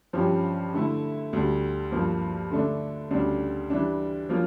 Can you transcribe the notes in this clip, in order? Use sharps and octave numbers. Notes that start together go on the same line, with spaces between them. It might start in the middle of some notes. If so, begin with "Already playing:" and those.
G2 F3 C#4 G4
D3 A3 E4
D2 D3 G3
G2 F3 A#3
D3 A3 D4
D2 C#3 G3 D4
E3 G3 D4
F3 A#3 C#4 F4